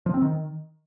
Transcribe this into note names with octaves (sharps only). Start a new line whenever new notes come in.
F3
C4
D#3